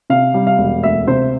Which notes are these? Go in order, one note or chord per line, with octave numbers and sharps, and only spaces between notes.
C3 F5
G3
F5
E1
D2 E5
C3 C5